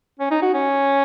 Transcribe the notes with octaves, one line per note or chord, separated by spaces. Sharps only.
C#4
D#4
F#4
C#4